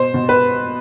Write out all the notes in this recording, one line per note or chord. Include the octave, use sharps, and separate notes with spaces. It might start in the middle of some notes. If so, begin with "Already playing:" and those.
Already playing: B2 C5
B2
B4